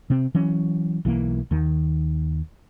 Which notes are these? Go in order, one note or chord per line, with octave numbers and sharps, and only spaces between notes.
C3 C4
E3 F#3 C#4
B1 E3 F3 A#3
D#2 D#3